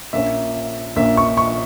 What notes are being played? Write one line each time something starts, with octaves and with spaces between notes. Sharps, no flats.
A#1 A#2 A#3 C#4 E5
A#1 A#2 A#3 C#4 E5
C#6
C#6